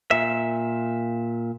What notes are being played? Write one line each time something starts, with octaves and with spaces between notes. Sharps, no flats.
A#2 E5